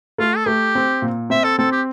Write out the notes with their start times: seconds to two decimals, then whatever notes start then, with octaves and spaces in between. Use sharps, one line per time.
0.19 A3 F4
0.37 A4
0.46 A3 G4
0.75 C4
1.02 A#2
1.30 C4 E5
1.44 A4
1.58 C4 A4
1.72 G4